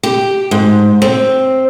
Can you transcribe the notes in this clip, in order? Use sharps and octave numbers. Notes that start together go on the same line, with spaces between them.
G4
G#2
C4